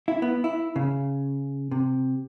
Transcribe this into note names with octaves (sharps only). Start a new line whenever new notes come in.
E4
B3
E4
C#3
C3